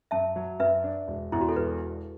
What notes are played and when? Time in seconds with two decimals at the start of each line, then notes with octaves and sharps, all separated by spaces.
0.11 F#2 E5 A5
0.36 F#3
0.60 F#2 B4 E5
0.84 D4
1.08 E1
1.32 E2 E4
1.41 F#4
1.49 A4
1.56 E1 B4